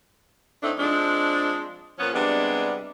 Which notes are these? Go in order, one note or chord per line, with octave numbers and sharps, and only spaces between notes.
A2 A3 C4 D4 D#4
F3 G#3 C4 D4
A#2 F3 B3 C#4
C3 G3 G#3 B3 D4